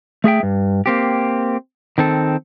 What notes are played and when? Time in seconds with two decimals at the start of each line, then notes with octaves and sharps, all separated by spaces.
0.24 A3 G#4 E5 G5
0.43 G2
0.86 A#3 C4 G4
1.98 D#3 C4 A4